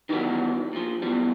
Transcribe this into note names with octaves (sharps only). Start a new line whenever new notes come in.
D#3 E3 F#3 G3 B3
A#2 F3
F#2 B2 E3 G3